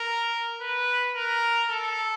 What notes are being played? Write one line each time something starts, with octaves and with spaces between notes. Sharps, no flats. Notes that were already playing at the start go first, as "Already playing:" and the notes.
Already playing: A#4
B4
A#4
A4